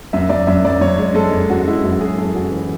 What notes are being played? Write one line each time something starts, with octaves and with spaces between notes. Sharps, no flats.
F#2 E5
F#2 D5
F#2 E5
F#2 D5
F#2 C#5
G#3
G#3 A4
F#2
F#2 F#4
G#3 E4
F#2 F#4
G#3 G#4
F#2 A4
F#2 F#4
E3